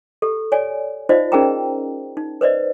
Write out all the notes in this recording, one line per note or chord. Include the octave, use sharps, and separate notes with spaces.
G4 A4
C#5 D5 G#5
D#4 F4 C5 D5 D#5 F5
C#4 D#4 G#4 A#4 G5 A#5
D#4
B4 C5 D5 D#5